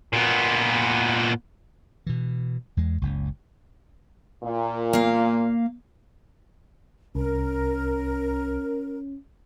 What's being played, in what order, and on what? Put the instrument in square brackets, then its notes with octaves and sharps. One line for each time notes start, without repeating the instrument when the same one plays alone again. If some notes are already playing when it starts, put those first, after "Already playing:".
[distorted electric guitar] A#2 B3
[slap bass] B2 E3
E2 G#3
F#1 C#2
[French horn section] A#2
[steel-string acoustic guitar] A#3 F5
[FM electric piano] C2 [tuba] C#4 [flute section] A#4